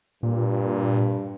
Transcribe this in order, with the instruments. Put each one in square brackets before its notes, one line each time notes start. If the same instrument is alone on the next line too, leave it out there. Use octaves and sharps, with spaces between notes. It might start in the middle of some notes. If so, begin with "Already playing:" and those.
[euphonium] G2 [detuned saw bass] A#2